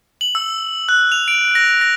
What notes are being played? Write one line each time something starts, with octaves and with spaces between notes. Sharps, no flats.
F#7
E6
F#6
F7
D7
A#6
A#6